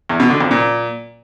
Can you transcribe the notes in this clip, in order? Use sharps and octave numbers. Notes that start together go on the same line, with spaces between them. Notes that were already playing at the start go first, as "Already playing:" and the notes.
E2
B2
D3
F2
A#2